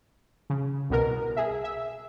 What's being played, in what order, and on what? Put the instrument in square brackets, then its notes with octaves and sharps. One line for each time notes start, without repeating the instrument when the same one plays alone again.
[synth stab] C#3
C2 B2 A#4
G#4 E5
E5